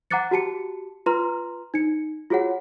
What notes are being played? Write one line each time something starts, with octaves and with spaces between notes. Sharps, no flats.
F#5 A#5 D6 F#6 A6 C#7
F#4 G4 A5 C#7
F4 B4 A#5 C6 F6
D#4 C#7
F4 F#4 G#4 C#5 F#5